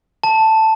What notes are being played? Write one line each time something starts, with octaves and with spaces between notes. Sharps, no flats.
A5